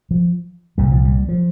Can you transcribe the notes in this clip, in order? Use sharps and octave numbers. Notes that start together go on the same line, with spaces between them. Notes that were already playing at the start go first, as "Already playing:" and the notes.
F3
C2 A#2 G3
F3
G3
F3